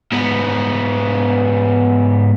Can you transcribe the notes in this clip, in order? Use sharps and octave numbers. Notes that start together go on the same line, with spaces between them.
G#2 B3